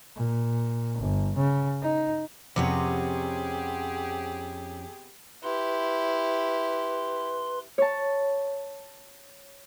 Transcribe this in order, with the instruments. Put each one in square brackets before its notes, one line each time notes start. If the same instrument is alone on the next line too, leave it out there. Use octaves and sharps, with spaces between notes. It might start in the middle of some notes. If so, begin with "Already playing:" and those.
[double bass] A#2
G1
C#3
D#4
[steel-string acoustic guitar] F2 C#4 C#5 [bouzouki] C3 B3 [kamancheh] G4 G#4
[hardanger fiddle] E4 G4 [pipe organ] B4 C6
[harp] C#5 A5